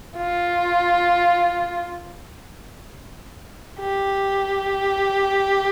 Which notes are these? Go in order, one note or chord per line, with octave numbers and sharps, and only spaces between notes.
F4
G4